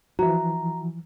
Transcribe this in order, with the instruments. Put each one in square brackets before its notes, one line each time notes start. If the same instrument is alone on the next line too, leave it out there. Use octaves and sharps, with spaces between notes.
[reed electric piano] E3 F3 [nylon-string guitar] F#4 E5 [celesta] A#5